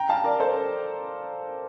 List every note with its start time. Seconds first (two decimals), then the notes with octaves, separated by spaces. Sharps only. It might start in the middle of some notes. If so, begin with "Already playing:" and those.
Already playing: G5 A#5
0.09 F5 A5
0.24 A#4 D5
0.40 A4 C5